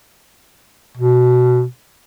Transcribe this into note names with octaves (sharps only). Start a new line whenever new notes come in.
B2